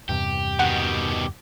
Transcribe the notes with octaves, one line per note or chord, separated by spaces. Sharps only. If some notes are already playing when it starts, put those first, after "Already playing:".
E2 G2 C3 G4
B2 D#3 F#5